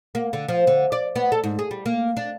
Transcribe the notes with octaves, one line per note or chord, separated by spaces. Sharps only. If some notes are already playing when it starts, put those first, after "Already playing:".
A#3
D3
F3
D3
D5
B3
A4
G#2
G#4
G3
A#3
D4